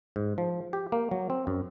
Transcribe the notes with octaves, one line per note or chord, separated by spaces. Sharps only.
G#2
F3
G4
A#3
F#3
C4
F#2